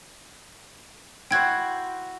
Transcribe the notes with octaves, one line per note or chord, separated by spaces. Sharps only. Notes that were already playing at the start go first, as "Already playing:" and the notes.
E4 F#4 C5 G5 G#6